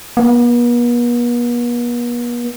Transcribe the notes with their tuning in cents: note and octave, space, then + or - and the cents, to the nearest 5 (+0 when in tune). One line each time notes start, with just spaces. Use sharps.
B3 -45